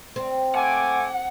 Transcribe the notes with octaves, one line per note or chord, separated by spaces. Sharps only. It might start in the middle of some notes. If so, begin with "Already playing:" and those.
C4
A3 F#5 G#5 D6